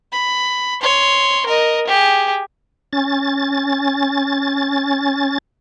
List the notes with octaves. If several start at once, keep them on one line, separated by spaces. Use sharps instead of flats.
B5
C#5 C6
A#4 D#5
G4 G#4
C#4 A6